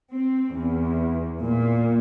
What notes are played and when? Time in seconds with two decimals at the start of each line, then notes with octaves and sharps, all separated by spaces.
0.12 C4
0.54 E2
1.43 A#2